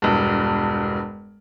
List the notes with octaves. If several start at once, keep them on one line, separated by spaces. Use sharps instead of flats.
E1 G2